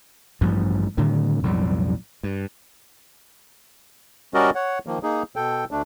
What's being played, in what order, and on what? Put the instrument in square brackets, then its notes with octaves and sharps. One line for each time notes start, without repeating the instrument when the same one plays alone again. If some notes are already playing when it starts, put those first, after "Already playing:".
[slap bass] A1 G2 F3
A2 D3 D#3 G3
B1 F2 A2 G3
G2
[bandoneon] G3 C#4 F#4 A#4 D5 D#5
C#5 F#5
D#3 F3 A#3
A#3 D#4 G#4
B2 A4 G5
D2 A3 D4